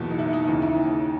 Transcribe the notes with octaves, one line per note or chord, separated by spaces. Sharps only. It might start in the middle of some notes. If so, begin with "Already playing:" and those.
Already playing: F#1 E2 B2
D#4
E4
D#4
D#2 C#3 E3 D#4
E4